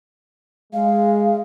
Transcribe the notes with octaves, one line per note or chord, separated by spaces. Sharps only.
G#3 F5